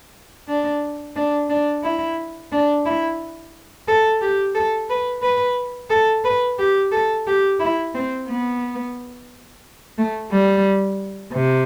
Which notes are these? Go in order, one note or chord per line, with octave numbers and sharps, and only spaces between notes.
D4
D4
D4
E4
D4
E4
A4
G4
A4
B4
B4
A4
B4
G4
A4
G4
E4
C4
B3
A3
G3
C3